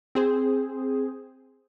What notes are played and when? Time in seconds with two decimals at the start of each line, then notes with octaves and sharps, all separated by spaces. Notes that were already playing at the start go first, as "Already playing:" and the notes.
0.15 C4 G#4 C5